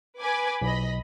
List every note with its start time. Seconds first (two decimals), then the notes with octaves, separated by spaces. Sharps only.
0.20 B4 G#5 D6
0.62 B1 D#5 B5